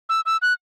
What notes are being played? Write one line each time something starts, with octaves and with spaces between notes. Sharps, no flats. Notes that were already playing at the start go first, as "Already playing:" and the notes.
E6
E6
F#6